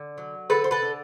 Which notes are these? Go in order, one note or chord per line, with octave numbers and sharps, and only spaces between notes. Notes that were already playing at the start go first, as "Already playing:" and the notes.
Already playing: D3
F#3
D3 A4 B4
C5
A4 B4
D3